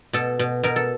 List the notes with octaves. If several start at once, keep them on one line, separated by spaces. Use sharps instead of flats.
B2 A4
B2
B2 A#4
A4